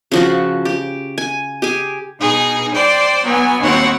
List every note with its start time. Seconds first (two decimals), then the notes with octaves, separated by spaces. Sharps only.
0.12 C#3 F3 F#4
0.65 G4
1.18 G#5
1.62 G4 G#4 G#5
2.19 B2 D#4 G#4
2.74 C5 D5 G5 C6
3.24 F#3 B3 G#5
3.60 D#2 B2 C4 F#4 C#5 F#5